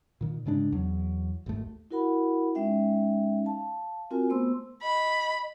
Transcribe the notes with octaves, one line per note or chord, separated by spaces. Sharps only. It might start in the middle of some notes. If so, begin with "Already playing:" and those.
A#2 D#3
G#2 C#3 G#3 D4
E2 F#3
G#1 D#2 A3
E4 F#4 A#4 F#5 B5
G#3 C#4 D#4 E5 G5
F5 A5
C4 F4 F#4 A#4 G#5
A3 B3 C5 C6 E6
D#5 B5